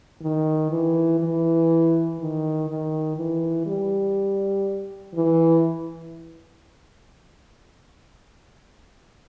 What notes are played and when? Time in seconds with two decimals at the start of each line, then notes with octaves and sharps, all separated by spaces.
0.22 D#3
0.70 E3
1.20 E3
2.19 D#3
2.68 D#3
3.17 E3
3.66 G3
5.14 E3